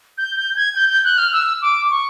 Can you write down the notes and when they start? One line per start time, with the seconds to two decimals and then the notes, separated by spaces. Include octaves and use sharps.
0.18 G6
0.36 G6
0.56 G#6
0.76 G6
0.89 G6
1.04 F#6
1.18 F6
1.33 E6
1.62 D6
1.90 C#6